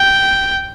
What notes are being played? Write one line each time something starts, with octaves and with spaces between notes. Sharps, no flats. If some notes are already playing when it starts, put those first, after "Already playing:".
Already playing: G5